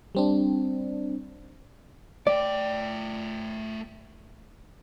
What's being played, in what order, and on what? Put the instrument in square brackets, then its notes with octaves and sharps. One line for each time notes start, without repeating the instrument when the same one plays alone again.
[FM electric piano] G3 C4 D4
[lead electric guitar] A3 G5 [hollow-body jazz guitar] D5